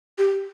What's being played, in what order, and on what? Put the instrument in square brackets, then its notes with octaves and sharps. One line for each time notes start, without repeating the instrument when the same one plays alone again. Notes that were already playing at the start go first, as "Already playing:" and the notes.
[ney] G4